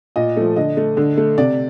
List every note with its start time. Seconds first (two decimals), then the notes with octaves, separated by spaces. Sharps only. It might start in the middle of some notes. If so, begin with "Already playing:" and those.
0.16 A#2 D#5
0.37 F3 A3
0.56 D3 D#5
0.77 A3
0.97 D3
1.17 A3
1.38 C3 D5